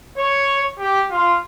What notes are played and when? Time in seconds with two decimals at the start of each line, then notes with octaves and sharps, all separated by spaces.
0.17 C#5
0.79 G4
1.11 F4